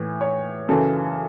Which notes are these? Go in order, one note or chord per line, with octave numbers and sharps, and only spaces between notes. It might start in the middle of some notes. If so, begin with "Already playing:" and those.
Already playing: A2 E3
C#5
F#2 C#3 E3 A4